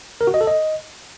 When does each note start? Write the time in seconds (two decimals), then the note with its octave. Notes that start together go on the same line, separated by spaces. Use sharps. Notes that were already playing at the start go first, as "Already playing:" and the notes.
0.21 A#4
0.27 F#4
0.34 D#5
0.41 A4
0.47 D#5